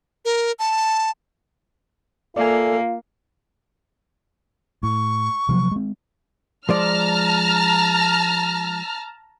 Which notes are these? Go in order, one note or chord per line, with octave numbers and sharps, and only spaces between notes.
A#4
A5
A#3 F4 A4 D5 E5 G#5
A2 C#6
C3 F3 F#3
G#3 C4
F3 G#3 D5 A5 A#5 F6